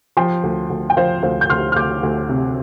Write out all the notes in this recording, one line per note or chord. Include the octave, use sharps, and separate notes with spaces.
F3 G5 C6
D2
D2
G5
F3 C5 F5
D2 C5 F5
G6
D2 C6 F6
F6
D2 D6 G6
D2
C3